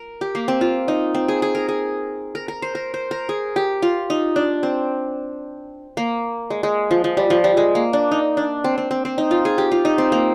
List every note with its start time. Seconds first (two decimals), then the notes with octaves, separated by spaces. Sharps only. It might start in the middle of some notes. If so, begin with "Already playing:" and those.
Already playing: A#4
0.21 G4
0.35 A#3
0.48 C4
0.61 F4
0.88 D#4
1.15 C4
1.28 G#4
1.42 G#4
1.55 A#4
1.69 G#4
2.35 A#4
2.48 A#4
2.62 C5
2.75 A#4
2.94 C5
3.11 A#4
3.29 G#4
3.56 G4
3.82 F4
4.10 D#4
4.36 D4
4.63 C4
5.97 A#3
6.50 G#3
6.63 G#3
6.91 F3
7.04 F3
7.17 G3
7.30 F3
7.44 G3
7.57 G#3
7.75 A#3
7.93 D4
8.11 D#4
8.37 D4
8.64 C4
8.78 C4
8.91 C4
9.05 C4
9.18 D#4
9.31 F4
9.45 G#4
9.58 G4
9.72 F4
9.85 D#4
9.98 C4
10.12 A#3